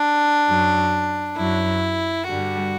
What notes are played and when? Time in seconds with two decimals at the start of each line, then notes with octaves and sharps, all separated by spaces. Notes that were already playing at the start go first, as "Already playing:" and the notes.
Already playing: D4
0.47 F#2 F#3
1.37 F#2 F#3 E4
2.28 G2 D3 G3 F#4